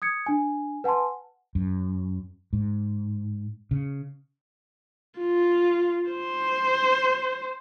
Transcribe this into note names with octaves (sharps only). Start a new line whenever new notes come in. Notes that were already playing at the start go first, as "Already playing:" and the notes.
D#6 G#6 C#7
D4 G#5
B4 F#5 G#5 A5 C6
F#2
G#2
C#3
F4
C5